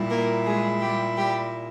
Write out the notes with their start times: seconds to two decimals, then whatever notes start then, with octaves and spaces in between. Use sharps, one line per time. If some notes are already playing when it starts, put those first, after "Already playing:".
Already playing: A#2 G3 E4
0.09 A#3 A#4
0.45 G#3 G#4
0.80 G3 G4
1.17 G3 G4